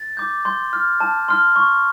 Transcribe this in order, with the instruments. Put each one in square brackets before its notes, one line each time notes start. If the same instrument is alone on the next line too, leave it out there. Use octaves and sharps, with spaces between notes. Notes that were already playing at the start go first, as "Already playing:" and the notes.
Already playing: [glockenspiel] A6
D6 G6
C6 G6
F6
A5
C6 F6
C#6